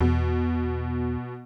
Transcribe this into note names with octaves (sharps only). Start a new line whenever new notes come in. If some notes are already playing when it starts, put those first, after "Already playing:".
E2 B2